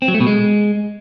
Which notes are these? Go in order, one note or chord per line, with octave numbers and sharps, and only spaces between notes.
C4
F#3
A3
B2
G#3